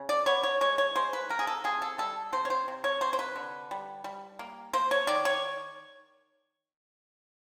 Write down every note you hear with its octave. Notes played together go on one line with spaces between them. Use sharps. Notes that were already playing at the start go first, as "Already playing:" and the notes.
Already playing: C#3
D5
B3 C#5
C#5
G#3 C#5
C#5
G#3 C5
B4
C3 A#4
G#4
A4
C3 G#4
A4
G3 A4
C3 C5
C#5
C5
C3
C#5
C3 C5
C5
B4
D3
G3
G3
A#3
A#3 C5
C#5
D#3 D5
C#5